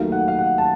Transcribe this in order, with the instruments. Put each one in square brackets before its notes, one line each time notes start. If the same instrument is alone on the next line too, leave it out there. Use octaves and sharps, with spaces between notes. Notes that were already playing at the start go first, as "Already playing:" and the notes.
Already playing: [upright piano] D#2 D#3 F#3 A3 [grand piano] F5
[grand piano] F#5
F5
F#5
A5